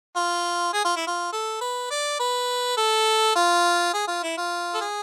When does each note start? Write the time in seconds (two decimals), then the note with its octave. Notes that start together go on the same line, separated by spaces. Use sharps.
0.16 F4
0.73 G#4
0.85 F4
0.96 E4
1.07 F4
1.33 A4
1.61 B4
1.91 D5
2.20 B4
2.77 A4
3.36 F4
3.94 G#4
4.08 F4
4.23 E4
4.38 F4
4.74 A4
4.81 G#4